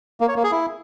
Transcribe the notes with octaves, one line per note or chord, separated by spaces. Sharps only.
A#3
C#5
A#3
G#4
E4